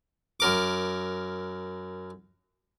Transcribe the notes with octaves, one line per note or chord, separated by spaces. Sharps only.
F#2 A#4 D6